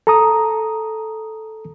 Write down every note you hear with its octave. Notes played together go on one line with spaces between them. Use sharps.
A4 A#5 D#6